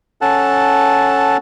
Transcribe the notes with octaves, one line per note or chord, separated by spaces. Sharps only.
C#4 A4 F#5 A5